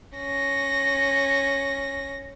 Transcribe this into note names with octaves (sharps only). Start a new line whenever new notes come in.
C#4 A#6